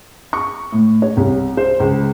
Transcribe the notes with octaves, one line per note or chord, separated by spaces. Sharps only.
C#6
A2
C#5
C2
C5
C#2